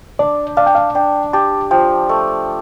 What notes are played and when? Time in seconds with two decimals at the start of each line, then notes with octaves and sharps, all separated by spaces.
0.19 D4 D5
0.57 D4 F5
0.66 G5
0.75 F5
0.95 D4 G5
1.33 G4 A5
1.71 F3 G5
2.09 A3